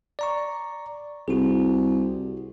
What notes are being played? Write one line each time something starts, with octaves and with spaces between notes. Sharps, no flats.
D5 A#5 C#6
C2 F#4 G#4